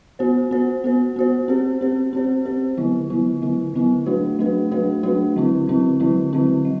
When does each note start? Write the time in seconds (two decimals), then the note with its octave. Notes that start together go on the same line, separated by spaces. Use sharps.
0.19 B3 F#4 C5
0.51 B3 F#4 C5
0.84 B3 F#4 C5
1.16 B3 F#4 C5
1.48 C4 G4 C5
1.81 C4 G4 C5
2.13 C4 G4 C5
2.45 C4 G4 C5
2.77 D3 F#3 B3 E4
3.10 D3 F#3 B3 E4
3.42 D3 F#3 B3 E4
3.74 D3 F#3 B3 E4
4.06 F#3 A3 D4 F#4 B4
4.39 F#3 A3 D4 F#4 B4
4.71 F#3 A3 D4 F#4 B4
5.03 F#3 A3 D4 F#4 B4
5.36 D3 F#3 C4 E4
5.67 D3 F#3 C4 E4
6.00 D3 F#3 C4 E4
6.33 D3 F#3 C4 E4
6.65 F#3